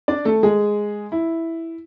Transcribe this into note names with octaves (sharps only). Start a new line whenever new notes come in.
D4 D5
A3 A4
G#3 G#4
E4